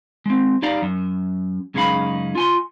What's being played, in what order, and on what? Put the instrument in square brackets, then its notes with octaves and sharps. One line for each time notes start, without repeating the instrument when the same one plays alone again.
[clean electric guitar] G#3 C4
D#4 G4 D5 F5 A#5
F#2
F#2 C#3 G#3 D#4 F5 B5
F4 G#5 C6